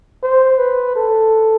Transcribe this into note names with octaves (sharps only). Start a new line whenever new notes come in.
C5
B4
A4